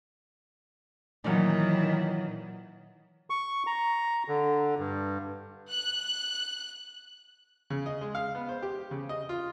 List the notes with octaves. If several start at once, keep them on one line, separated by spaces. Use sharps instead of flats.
A#2 D#3 E3 F#3 D#4
C#6
A#5
D3
G2
F#6
C#3
D#5
G#3
F5
B3
C5
G4
C#3
D#5
F4